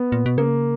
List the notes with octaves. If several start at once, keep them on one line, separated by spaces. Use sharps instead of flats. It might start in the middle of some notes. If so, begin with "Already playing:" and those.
Already playing: B3
A#2
B2
C#3 A#3